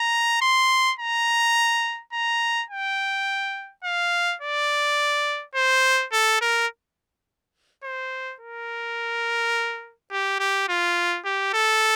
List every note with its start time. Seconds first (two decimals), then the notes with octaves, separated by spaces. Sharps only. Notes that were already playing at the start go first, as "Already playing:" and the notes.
Already playing: A#5
0.42 C6
0.99 A#5
2.13 A#5
2.70 G5
3.84 F5
4.42 D5
5.55 C5
6.12 A4
6.41 A#4
7.83 C5
8.40 A#4
10.11 G4
10.40 G4
10.69 F4
11.25 G4
11.53 A4